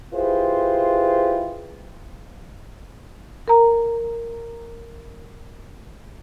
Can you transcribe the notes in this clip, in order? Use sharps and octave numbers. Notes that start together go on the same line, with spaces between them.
E4 F4 G4 G#4 B4 C5
A#4 A#5